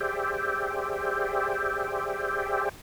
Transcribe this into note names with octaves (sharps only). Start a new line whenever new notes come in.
G4 G#4 C5 D5 E5 G5